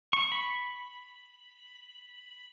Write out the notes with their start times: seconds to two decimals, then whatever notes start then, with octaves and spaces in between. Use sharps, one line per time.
0.13 C#6
0.32 B5